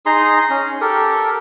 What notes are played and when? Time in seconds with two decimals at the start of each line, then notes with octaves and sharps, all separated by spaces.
0.06 D#4 G#4 A#5 C6
0.50 C#4
0.81 G4 A4 A#4